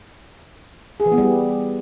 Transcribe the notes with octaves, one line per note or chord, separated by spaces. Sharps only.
G#4
E3
B3
G3